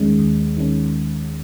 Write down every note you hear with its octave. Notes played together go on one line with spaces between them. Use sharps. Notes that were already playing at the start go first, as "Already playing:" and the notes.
Already playing: D#2 D#3 G#3 C#4
D#2
D#3 G#3 C#4